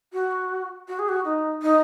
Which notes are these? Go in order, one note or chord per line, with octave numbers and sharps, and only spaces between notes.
F#4
F#4
G#4
F#4
D#4
D#4